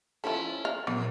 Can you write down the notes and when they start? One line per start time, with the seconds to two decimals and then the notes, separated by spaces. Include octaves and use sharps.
0.24 F3 C#4 E4 A4
0.65 F5
0.87 F2 A#2 F#3 B3